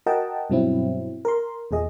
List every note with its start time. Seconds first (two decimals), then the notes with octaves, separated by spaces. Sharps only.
0.06 F#4 A#4 D#5 F#5 G5 A5
0.50 G2 B2 F#3 C4 E4
1.25 A#4 C6
1.71 E2 A#2 G#4 D#5